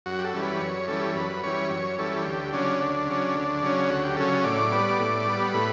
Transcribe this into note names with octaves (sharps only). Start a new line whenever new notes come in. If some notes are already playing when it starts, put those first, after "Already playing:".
F#2 F#4
G4
A4
E3 G3 C#4
B4
F#2 C#5
E3 G3 C#4 A4
F#2 B4
E3 G3 C#4 C#5
F#2 C#5
E3 G3 C#4 A4
D2 G4
C#3 F#3 C#4 D4
D2
C#3 F#3 C#4
D2
C#3 F#3 C#4
D2 F#4
G4
C#3 F#3 C#4 A4
A2 D5
G3 B3
A2
G3 B3
A2 B4